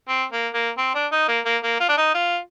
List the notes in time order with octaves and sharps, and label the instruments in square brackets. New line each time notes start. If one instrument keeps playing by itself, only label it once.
[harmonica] C4
A#3
A#3
C4
D4
D#4
A#3
A#3
A#3
F4
D4
D#4
F4